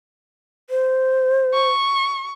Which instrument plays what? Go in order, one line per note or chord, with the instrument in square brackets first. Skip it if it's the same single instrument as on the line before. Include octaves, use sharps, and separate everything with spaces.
[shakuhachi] C5
[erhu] C#6